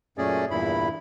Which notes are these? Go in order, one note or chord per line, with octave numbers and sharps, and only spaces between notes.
F#2 A#2 A3 C#4 G#4 D5
E2 G2 A#2 E4 B5